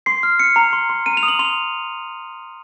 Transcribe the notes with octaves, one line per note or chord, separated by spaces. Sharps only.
C6 C7
F6
F6 C#7
A#5
C6
C6
A#5 D#7
F7
D#6
F#7
C6 F7